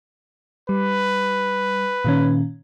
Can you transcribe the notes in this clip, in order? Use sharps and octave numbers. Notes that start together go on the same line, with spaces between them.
G3 B4
A#2 D#3 C#4